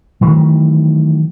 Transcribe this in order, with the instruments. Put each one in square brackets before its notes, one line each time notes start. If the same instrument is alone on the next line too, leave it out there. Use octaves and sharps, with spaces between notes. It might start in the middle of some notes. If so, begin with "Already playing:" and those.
[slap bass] D#3 E3 F#3 A3